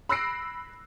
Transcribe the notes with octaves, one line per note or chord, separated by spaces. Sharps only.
B5 E6 F#6 A#6 C7 D7